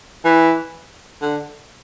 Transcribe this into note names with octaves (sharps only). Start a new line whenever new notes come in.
E3
D3